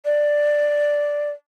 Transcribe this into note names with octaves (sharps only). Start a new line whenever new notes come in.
D5